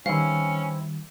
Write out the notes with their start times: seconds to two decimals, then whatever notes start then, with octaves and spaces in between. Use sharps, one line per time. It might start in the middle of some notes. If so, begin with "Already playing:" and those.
0.06 D#3 E3 G3 C4 C#4 E4 F5